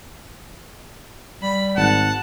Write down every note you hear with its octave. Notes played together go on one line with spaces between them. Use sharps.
G3 B5
G#1 F#5 A5